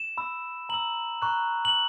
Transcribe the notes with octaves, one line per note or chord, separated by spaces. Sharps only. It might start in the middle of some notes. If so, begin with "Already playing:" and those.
Already playing: E7
B5 E6
A#5 E6 F#7
A#5 C#6 F#6
F#7